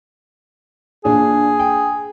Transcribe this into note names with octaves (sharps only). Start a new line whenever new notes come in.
A#2 D4 G#4
G5